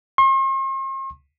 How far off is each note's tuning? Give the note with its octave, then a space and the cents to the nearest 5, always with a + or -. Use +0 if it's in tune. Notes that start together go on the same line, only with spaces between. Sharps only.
C6 +45